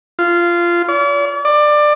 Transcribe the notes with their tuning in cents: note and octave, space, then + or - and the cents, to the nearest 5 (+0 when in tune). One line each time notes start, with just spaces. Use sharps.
F4 -15
D5 -45
D5 +20